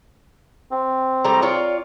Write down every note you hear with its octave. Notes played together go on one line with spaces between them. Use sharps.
C4
A2 G3 A#5
F4 C#5 D5